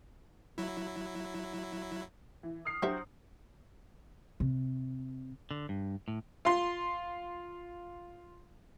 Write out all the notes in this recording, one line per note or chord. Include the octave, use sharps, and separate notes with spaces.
F#3 E4
E3
D#6 F6 C7
F#3 D4 F#4 G4 C5 E5
C3
D3
G2
A2
F4 C6